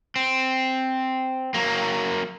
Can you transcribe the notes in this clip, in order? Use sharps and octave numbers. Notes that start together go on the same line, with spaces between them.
C4
F#3 A#3